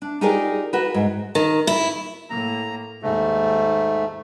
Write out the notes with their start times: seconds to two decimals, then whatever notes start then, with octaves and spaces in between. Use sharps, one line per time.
0.02 D4
0.21 D#4 F4 G4 G#4 A#4 D5
0.73 F#4 A#4 B4
0.94 G#2
1.35 D#3
1.67 E4
2.30 A2 A#3 A#5
3.02 D#2 G#2 A3